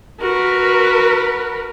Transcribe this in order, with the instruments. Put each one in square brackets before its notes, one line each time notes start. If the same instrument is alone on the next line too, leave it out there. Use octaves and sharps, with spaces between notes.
[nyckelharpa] F#4 [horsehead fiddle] A#4 B4